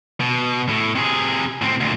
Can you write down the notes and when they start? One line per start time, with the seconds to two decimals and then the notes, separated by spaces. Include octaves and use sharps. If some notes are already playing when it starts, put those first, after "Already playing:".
0.20 B2
0.69 A2
0.95 C3 G#4
1.62 A2 C4
1.81 D2 A#2